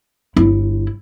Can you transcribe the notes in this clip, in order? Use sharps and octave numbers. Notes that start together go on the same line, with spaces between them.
G1 E4